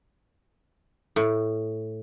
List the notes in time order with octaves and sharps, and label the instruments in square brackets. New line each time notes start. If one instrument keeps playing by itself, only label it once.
[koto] A2